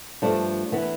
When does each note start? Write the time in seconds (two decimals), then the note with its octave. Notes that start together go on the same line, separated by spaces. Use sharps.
0.22 G2 F3 A3 D4
0.72 E3 B3